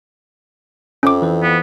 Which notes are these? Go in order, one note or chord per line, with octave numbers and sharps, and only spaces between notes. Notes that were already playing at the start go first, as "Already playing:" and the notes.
F2 C#4 D6
E3 C5
B3